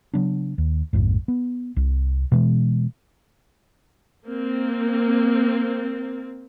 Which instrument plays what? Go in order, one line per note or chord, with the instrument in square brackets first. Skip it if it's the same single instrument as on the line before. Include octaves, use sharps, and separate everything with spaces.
[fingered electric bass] C#3 F#3 B3 D4
D#2
A#1 F2 G#2
B3
C2
B2 E3 G#3
[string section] A#3 C4